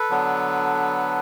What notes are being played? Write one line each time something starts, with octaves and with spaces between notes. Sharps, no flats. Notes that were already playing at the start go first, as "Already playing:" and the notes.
Already playing: A4 B4
D3 F#3 B3 D4